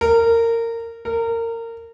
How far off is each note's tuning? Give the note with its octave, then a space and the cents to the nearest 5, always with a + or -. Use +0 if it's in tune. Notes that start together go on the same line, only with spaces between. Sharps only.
A#4 -20
A#4 -25